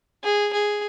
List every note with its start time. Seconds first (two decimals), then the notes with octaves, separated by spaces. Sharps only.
0.24 G#4
0.53 G#4